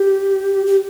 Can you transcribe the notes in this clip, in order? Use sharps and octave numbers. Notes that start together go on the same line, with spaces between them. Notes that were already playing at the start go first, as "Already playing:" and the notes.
Already playing: G4
G4